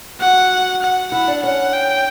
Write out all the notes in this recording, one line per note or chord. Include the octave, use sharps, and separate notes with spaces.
F#4 F#5
F#5
E4 F#5
D4
C#4 F#5
G5